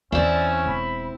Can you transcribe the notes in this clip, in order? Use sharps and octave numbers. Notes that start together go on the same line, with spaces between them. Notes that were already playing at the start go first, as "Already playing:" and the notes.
E2 E3 C4 C#4 E4 D5
E1 B5